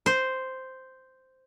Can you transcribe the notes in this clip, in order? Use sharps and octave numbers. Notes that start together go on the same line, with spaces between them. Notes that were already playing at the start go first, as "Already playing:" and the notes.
C5